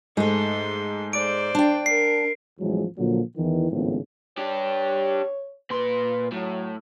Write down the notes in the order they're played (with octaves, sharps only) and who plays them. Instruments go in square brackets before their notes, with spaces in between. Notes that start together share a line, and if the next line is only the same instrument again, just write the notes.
[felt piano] G#2 [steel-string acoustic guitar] G#3 A3 [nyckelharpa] A4 C6
[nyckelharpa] C5 D5 [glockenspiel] D7
[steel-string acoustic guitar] D4 G5
[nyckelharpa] A#4 [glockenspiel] C7
[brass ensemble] A1 E2 F3 F#3 G#3
A#2 D3 F3 F#3 A#3
E2 D#3 E3
G#1 A2 C#3 F3 B3
[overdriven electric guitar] D4 G4 [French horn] C#5
[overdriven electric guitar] A#2 C6 [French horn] B4
[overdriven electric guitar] A2 [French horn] F#3